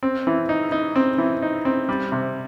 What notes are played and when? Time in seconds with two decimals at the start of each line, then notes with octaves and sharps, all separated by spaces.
0.03 C4
0.27 E3
0.49 D#4
0.72 D#4
0.96 C4
1.18 E3
1.42 D#4
1.65 C4
1.89 G3
2.12 C3